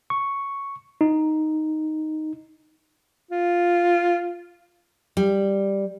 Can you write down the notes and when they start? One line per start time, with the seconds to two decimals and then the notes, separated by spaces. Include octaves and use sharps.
0.10 C#6
1.01 D#4
3.31 F4
5.17 G3